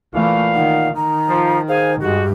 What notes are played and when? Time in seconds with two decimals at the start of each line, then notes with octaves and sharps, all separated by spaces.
0.14 A#2 E3 A3 F5
0.55 D#3 F#5
0.96 D#3 A#5
1.28 F3
1.68 G#4 C5 F5 G#5
2.01 G2 G#3 F#4 G4